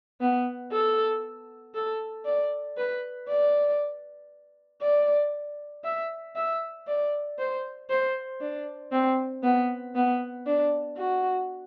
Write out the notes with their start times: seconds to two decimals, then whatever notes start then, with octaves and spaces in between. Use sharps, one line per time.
0.21 B3
0.72 A4
1.75 A4
2.25 D5
2.77 B4
3.28 D5
4.82 D5
5.84 E5
6.36 E5
6.87 D5
7.39 C5
7.90 C5
8.41 D4
8.92 C4
9.43 B3
9.95 B3
10.46 D4
10.97 F#4